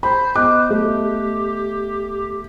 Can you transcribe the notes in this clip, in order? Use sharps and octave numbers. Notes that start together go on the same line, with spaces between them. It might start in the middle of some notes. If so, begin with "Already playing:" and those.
C5 B5
B3 D#5 D6 F#6
A3 G4